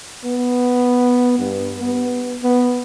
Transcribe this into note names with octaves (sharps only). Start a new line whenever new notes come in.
B3
G2
B3
B3